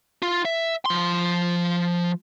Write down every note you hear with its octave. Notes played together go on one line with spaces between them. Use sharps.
F4
E5
F3 C6